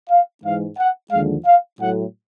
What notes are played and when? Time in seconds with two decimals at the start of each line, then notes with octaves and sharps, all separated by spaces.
0.10 F5
0.44 G#2 E3 G#3 F5
0.78 F#5
1.11 D#2 D3 F3 G#3 F5
1.46 F5
1.80 A2 F#3 A3 F#5